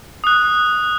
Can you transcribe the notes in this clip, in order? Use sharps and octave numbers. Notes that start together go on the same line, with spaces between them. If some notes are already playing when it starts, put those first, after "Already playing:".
D#6 F#6